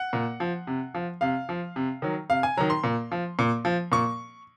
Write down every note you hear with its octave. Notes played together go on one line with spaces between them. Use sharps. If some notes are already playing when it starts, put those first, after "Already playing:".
Already playing: F#5
A#2
F3
C3
F3
C3 F5
F3
C3
D#3 F#3
C3 F5
G#5
D#3 F#3 A#5
C6
A#2
F3
A#2
F3
A#2 C#6